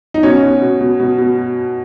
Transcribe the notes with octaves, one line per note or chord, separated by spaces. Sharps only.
D#4
B2 C#4
B2
B2
B2
B2
B2